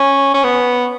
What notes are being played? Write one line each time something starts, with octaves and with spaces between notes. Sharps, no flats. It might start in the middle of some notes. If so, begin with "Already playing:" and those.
Already playing: C#4
C#4
B3